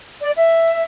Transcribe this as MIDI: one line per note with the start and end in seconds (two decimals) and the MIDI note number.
0.21 0.31 74
0.37 0.83 76